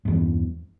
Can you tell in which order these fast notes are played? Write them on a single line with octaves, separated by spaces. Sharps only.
G2 E2 E3